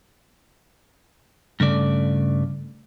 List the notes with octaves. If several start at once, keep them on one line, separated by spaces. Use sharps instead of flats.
G2 C#3 A3 D5